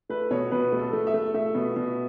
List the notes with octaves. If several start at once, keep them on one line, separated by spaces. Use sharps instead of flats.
A3 B4
B2 C#5
B2 B4
A3
A4
A3
E5
A3
A3 E5
B2
B2